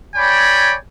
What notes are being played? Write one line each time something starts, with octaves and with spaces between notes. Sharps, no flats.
C#5 D5 G5 G#5 B5